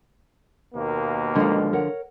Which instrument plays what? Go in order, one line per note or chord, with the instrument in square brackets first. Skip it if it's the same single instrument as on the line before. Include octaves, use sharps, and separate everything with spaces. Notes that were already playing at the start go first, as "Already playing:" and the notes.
[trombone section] D#2 B2 A#3
[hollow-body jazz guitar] D3 F3 [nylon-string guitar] G#3 D5
[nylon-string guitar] A#4 C#5 F#5